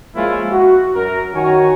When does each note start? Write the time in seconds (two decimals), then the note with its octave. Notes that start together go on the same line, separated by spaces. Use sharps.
0.16 F3 G#3 A#3 C#4 E4 F4
0.52 F#4
0.94 F#2 A#4
1.34 F#2 D#3 F#4 C#5 G#5 A#5